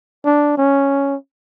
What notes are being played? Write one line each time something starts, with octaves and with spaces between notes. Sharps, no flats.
D4
C#4